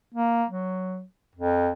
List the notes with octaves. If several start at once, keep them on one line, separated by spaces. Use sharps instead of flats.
A#3
F#3
F2